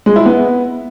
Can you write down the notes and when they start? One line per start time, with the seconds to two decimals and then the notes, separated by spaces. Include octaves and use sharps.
0.06 G#3
0.16 E4
0.26 B3